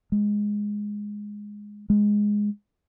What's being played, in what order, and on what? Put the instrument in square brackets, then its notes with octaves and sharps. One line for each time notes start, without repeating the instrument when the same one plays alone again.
[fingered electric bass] G#3
G#3